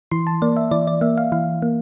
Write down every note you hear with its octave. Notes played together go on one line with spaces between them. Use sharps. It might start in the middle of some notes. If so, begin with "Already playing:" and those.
E3 C6
A5
A#3 D5
E5
E3 D5
D5
A#3 E5
F5
E3 F5
A#3